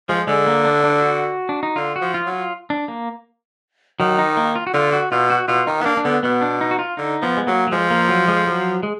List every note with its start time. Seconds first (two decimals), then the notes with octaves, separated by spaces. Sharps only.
0.09 F3 G#3
0.27 D3 G#3
0.47 A#3
0.65 D4
0.84 D4
1.02 F#4
1.49 D4
1.63 D#4
1.76 D3 F4
1.96 F#4
2.01 F3
2.14 F4
2.26 F#3
2.33 F4
2.70 D4
2.88 A#3
4.00 D#3 F#3
4.19 D#4
4.37 A#3
4.56 F4
4.67 F#4
4.74 D3 F4
4.93 F#4
5.11 B2 F4
5.30 F#4
5.48 B2 F4
5.67 D#3 D#4
5.82 B3
5.86 A#3 D4
5.97 D4
6.05 D3 B3
6.23 B2 B3
6.41 D4
6.61 D#4
6.71 F#4
6.79 F4
6.97 D3 D#4
7.22 F3 B3
7.37 G#3
7.47 F#3 A#3
7.67 F#3
7.72 F3 G#3
7.90 A#3
8.09 F#3
8.28 G#3
8.47 F#3
8.83 G#3